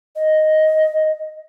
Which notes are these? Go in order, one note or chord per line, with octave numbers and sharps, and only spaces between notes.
D#5